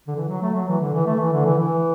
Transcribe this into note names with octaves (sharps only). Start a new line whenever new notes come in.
D3
E3
F#3
A3
F#3
E3
D3
E3
A3
E3
D3
E3
E3